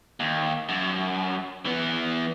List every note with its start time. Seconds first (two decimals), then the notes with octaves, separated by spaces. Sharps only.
0.20 D#2
0.69 F#2
1.66 E3 B3